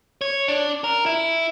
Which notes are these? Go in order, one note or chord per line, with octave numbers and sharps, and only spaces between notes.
C#5
D4
A#4
E4